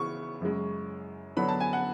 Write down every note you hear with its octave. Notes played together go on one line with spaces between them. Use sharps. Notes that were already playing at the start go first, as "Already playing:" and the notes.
Already playing: C#3 E3 B3 C#6
F#2 C#3 G#3
D3 F#3 B3 D4 B5
A5
G#5
F#5